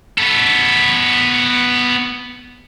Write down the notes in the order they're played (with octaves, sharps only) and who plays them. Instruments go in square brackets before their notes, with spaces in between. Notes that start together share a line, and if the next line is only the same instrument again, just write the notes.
[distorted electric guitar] B3 A4